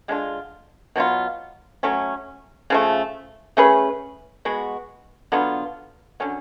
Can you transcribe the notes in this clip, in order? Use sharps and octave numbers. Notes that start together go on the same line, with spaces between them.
D3 G#3 D4 F4
B2 F#3 B3 F4
F#3 A3 C#4
C#3 F3 A3
A3 C#4 G#4 B4
G#3 B3 F#4
D3 F#3 B3 F4
D3 F#3 C#4